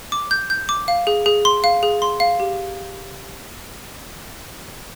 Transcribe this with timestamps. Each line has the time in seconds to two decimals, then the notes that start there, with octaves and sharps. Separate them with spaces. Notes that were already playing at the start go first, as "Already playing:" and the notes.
0.12 D6
0.31 G6
0.50 G6
0.69 D6
0.88 F5
1.07 G#4
1.26 G#4
1.45 C6
1.64 F5
1.83 G#4
2.02 C6
2.20 F5
2.40 G4